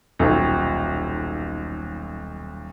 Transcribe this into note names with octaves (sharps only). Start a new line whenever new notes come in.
D#1 B1